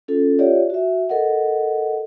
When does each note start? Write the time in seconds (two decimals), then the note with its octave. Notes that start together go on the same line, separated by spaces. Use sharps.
0.08 C#4 F4 A4
0.39 F4 G4 C#5 D5 E5 F#5
0.70 F#4 E5
1.09 A4 A#4 D#5 F#5